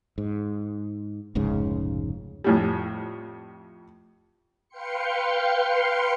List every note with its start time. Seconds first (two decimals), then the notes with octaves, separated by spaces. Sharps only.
0.18 G#2
1.35 F1 C#2 G#2 C#3
2.44 F2 A2 G3
4.69 B4 F5 G5 C6 C#7